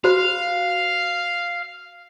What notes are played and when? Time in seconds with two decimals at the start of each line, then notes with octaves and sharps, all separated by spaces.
0.04 F#4 C5 F5 B5